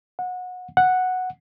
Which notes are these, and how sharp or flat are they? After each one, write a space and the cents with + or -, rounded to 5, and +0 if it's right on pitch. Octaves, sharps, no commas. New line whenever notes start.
F#5 -25
F#5 -5